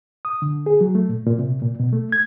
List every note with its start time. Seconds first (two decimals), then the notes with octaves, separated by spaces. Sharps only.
0.25 D#6
0.42 D3
0.66 G#4
0.81 F#3
0.95 A3
1.09 A#2
1.26 A#2
1.39 C3
1.61 A#2
1.80 B2
1.93 A3
2.12 G#6